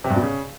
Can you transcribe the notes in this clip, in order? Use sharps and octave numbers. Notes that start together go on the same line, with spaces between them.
C3
G2
B2
C#3